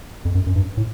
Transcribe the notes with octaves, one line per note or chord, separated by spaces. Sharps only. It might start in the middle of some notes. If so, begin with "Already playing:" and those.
F2
F#2
F#2
G2
A2